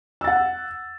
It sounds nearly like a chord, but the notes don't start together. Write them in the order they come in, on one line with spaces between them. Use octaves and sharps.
E6 A6 F#5